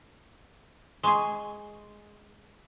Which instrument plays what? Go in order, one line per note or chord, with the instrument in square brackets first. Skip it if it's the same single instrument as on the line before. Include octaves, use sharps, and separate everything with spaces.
[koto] G#3 G#4 [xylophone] C6 C#6